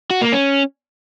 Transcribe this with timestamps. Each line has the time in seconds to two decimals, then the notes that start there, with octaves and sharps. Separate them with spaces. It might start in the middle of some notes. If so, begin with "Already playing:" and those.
0.11 F#4
0.21 A#3
0.32 C#4